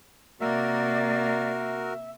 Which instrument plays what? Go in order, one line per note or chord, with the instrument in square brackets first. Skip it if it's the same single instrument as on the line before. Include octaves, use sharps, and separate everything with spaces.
[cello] C3 A#3 [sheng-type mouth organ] F#4 A#4 [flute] D5 [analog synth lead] E5